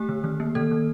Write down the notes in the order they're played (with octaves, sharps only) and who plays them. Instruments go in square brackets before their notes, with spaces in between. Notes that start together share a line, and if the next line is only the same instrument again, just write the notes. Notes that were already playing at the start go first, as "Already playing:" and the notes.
Already playing: [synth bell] A3 G4
D3
D#3
A#3
D#3 A4
D#3